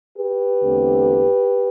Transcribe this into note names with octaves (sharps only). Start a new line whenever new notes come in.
G4 B4
E2 D3 A3 C4